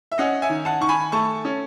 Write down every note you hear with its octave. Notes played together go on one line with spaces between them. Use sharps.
E5
C#4 D#5 F#5
E5 G#5
D#3
F#5 A5
D#3 C#6
G#5 B5
A3 A5 C#6
C#4